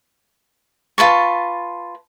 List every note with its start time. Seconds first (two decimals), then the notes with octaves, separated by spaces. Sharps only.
0.98 F4 B4 A5 C#6